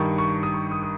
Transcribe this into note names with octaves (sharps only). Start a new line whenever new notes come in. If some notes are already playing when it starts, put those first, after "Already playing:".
Already playing: G2 D#3 C#6
C#6
D#6
C#6
D#6
D#6